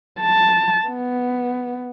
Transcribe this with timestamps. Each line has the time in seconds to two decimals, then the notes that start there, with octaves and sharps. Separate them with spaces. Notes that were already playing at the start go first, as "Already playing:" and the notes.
0.20 A5
0.86 B3